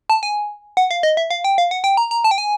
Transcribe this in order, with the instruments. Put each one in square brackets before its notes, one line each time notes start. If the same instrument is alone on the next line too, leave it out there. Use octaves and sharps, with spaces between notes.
[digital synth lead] A5
G#5
F#5
F5
D#5
E5
F5
G5
F5
F#5
G5
A#5
A#5
A5
G5
G#5